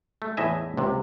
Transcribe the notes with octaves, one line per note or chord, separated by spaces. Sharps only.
A3
E2 A2 D#5 E5 G#5
C#2 C3